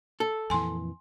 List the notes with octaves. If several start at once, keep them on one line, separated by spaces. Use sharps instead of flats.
A4
F2 A#2 E3 G#5 C6